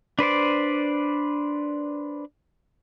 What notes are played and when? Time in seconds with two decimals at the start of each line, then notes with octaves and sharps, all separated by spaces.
0.19 D4 B4 C5 D5